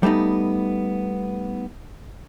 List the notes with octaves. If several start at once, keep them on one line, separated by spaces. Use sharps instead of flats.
G3 A3 B3 D#4